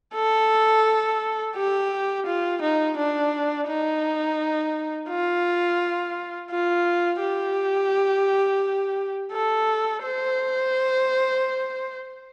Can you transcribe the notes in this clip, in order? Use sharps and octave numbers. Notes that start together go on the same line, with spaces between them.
A4
G4
F4
D#4
D4
D#4
F4
F4
G4
A4
C5